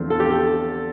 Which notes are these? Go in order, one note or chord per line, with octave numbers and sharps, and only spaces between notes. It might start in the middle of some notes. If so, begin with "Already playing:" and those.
Already playing: E2 D3 F3 A3 C4
A4
G4
A4